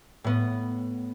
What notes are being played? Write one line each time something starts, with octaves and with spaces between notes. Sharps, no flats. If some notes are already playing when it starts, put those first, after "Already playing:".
A2 B3